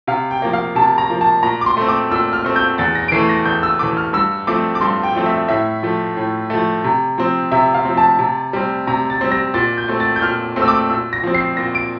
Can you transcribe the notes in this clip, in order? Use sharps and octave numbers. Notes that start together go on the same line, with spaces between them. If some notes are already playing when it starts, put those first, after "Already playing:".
C3 F5
G5
F3 A#3
F5
C3 A5
A#5
F3 A#3
A5
A#2 A#5
D6
C6
A3 C4
D6
A#2 E6
F6
A3 C4
G6
E2 A6
A#6
D7
E3 A3 C7
A#6
E2 G6
E6
E3 A3 D6
F6
G2 E6
F3 A3 C4 D6
D6
G2 C6
G5
F3 A3 C4
E5
A2 E5
F3 A3
A2
F3 A3
C3
F3 C4
C3 E5
F5
F3 C4
A5
C3
G3 C4
C3 A#5
A6
G3 C4
A#6
A#2 A6
G6
A3 C4
A6
G6
A#2 F6
A3 C4
E6
D6
A#2 E6
A#6
F3 C4
C7
A#2 A#6
D7